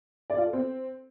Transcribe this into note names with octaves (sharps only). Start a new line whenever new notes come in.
D5
F4
A4
C4